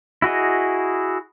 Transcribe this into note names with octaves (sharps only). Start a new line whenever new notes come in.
E4 F#4 G#4 D#5